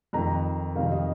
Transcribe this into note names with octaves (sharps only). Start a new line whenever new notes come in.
F2 D#3 A#5
F2 C3 D#3 F5
D#5